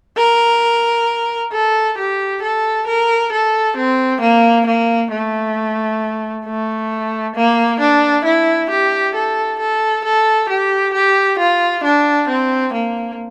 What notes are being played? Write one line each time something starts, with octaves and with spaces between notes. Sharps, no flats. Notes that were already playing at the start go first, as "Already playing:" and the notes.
A#4
A4
G4
A4
A#4
A4
C4
A#3
A#3
A3
A3
A#3
D4
E4
G4
A4
A4
A4
G4
G4
F4
D4
C4
A#3